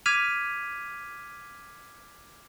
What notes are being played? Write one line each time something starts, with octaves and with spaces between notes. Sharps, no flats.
D6 F6 G#6 B6 D#7 F7